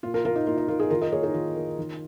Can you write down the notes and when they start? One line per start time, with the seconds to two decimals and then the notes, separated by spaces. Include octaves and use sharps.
0.03 A#2 F4
0.14 F4 A#4
0.25 A#3 F4 A#4
0.36 D#4
0.47 A#2 F4
0.57 D#4
0.68 A#3 F4
0.80 D#4 G#4
0.90 D#3 F4 A#4
1.02 A#4 D#5
1.12 A#3 G#4 C#5
1.23 D#4 G#4
1.34 D#3 F4
1.56 A#3
1.78 D#3